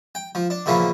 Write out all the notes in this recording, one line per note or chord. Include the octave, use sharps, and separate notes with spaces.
G5
F3
D4
A#2 C#3 E3 F3 A#3 B3